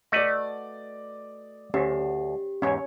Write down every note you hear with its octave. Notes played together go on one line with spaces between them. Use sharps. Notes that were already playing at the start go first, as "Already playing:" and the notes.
A3 F#4 B4 D5 D#5
D2 C#4 G4 C5
E2 G#2 C#4 C#5